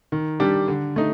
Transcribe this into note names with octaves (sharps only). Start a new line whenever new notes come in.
D#3
G3 D4 G4
D3
A3 D#4